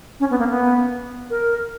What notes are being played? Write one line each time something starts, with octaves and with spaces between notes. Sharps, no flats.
C#4
B3
A#3
B3
A#4